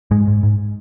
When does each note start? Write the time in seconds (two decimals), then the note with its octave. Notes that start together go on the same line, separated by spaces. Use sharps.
0.11 G#2 G#3
0.27 G#2
0.43 G#2